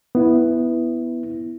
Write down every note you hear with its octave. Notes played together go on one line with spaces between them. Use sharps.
B3 E4